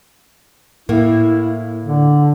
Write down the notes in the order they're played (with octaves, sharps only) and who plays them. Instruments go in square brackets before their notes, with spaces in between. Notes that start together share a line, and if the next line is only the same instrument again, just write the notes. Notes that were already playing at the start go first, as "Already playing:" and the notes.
[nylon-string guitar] A2 A#3 [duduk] E4
[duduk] D3